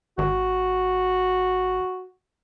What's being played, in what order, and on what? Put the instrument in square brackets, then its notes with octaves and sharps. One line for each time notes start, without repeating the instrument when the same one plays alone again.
[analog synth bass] G#1 [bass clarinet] F#4